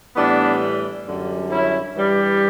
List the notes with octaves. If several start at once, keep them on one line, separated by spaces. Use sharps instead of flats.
A2 E3 G3 B3 D4
F#2 D3 G3
C#4 E4
G2 E3 G3